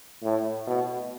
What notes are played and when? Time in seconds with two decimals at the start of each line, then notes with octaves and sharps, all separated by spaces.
0.23 A2
0.67 B2